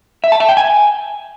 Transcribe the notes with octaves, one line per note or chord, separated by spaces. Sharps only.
E5
A5
E5
G5
G#5